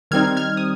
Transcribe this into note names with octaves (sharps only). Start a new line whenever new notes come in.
D#3 G3 C4 D#4 F6 G#6
F6 G#6
D#6